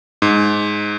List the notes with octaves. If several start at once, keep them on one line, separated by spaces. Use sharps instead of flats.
G#2